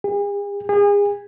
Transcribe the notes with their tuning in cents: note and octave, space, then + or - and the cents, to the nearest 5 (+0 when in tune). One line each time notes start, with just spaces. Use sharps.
G#4 -45
G#4 -35